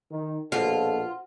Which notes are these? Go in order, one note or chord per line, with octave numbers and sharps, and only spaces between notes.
D#3
A#1 B2 F4 F#4 A4 C5